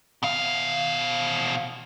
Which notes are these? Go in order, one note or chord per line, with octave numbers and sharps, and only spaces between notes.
B2 F5